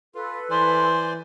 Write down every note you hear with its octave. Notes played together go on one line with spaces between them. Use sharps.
F4 A4 B4
E3 C5 D5 G#5 C6